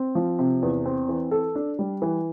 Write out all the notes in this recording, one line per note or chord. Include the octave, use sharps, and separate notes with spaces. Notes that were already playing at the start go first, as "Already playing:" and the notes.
Already playing: C4
F3
C3
E2
C4
E3
A4
D4
G3
E3